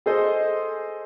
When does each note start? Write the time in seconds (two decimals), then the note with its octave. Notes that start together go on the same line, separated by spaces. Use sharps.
0.06 G#4 A4 C5 D#5